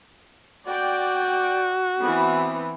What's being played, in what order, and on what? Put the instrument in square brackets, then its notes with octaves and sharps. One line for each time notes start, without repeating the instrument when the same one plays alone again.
[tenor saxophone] F#4 [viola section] D5 G5
[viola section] E3 B3 C4